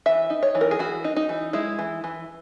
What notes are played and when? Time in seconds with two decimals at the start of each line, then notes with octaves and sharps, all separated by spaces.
0.06 E3 E5
0.30 D#4
0.43 C#5
0.55 E3
0.61 A#4
0.71 G#4
0.79 E3 F#4
1.04 D#4
1.16 D#4
1.29 E3
1.53 G#3 E4
1.79 E3
2.04 E3